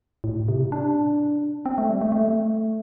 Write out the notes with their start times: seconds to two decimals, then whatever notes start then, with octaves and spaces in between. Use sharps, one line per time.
0.24 A2
0.48 C3
0.72 D4
1.66 C4
1.78 A3
1.89 G3
2.01 A3
2.12 A3